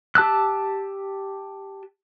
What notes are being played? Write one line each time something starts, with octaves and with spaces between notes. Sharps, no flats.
G4 A5 E6 F#6